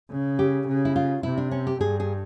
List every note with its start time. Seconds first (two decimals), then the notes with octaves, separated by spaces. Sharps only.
0.11 C#3
0.39 G4
0.68 C#3
0.85 E4
0.96 F4
1.23 C3 E4
1.37 D4
1.51 C#4
1.67 G4
1.80 G2 G#4
2.00 G#4